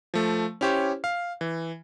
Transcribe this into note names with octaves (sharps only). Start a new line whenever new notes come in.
F3 A3
C#4 E4 G4 C5 C#5
F5
E3